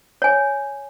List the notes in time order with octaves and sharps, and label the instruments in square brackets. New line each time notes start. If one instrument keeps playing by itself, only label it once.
[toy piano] C#5 G#5